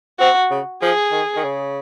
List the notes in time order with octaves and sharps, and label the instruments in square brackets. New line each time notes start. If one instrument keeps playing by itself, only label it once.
[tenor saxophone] C4 [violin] F#4
[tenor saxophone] C#3
[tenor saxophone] F3 [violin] G#4
[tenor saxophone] D#3
D#3
C#3